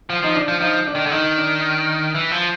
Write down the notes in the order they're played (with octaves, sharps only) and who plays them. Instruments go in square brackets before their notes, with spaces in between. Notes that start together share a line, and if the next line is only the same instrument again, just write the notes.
[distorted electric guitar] F3
[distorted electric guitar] F3 [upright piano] D#4
[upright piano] D4
[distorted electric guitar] F3
[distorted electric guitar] F3 [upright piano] D#4
[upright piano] D4
[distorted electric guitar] D#3
D3
[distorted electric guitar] D#3 [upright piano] D#4
[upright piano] D4
[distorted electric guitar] E3
F3